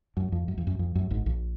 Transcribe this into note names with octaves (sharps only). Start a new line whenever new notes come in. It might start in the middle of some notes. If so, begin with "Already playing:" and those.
F#2
F2
F#2
F2
F#2
F2
F#2
G#1 G#2
A#1 A#2